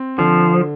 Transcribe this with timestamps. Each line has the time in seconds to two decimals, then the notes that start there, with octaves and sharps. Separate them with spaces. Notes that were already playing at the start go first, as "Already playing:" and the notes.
Already playing: C4
0.18 D3 F3